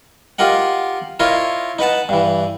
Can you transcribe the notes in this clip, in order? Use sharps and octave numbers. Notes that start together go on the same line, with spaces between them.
F4 G4 A#4 D#5 F#5
E4 F4 A#4 C#5 D#5
D#4 B4 F#5 A5
G2 E3